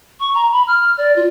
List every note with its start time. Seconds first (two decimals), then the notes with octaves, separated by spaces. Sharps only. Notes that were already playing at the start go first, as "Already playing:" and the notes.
0.20 C#6
0.34 A#5
0.52 B5
0.67 F6
0.97 D5
1.16 F4